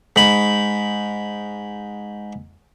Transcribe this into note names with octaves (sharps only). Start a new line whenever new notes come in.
G#2 B5